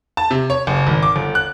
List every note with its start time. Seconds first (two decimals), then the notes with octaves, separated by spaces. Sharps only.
0.17 A5
0.31 C3
0.50 C#5
0.67 F#1
0.87 G#1
1.02 D6
1.16 G1
1.35 F#6